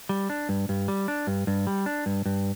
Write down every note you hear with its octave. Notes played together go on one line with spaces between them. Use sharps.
G3
D4
G2
G2
G3
D4
G2
G2
G3
D4
G2
G2